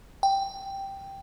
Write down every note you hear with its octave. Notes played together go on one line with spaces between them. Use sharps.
G5